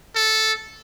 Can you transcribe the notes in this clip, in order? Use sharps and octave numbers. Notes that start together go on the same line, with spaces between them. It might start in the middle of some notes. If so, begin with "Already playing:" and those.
A4